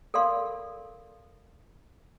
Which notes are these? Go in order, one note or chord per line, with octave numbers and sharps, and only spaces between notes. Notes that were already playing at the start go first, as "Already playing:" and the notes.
A4 A#4 D5 F5 C6